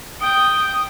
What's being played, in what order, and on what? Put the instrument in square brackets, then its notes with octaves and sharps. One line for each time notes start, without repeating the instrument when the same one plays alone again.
[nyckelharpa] G5 [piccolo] D#6